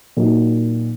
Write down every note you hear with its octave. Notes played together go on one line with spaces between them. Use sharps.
A#2 F#3 A#3 D#4 F#4